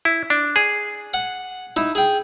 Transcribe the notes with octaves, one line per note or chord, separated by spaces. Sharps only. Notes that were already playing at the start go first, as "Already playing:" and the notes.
E4
D4
G#4
F#5
D#4 E4
G#4 G5